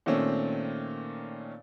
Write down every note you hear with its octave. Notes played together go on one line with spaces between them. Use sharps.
A#2 D#3 A3 C4 C#4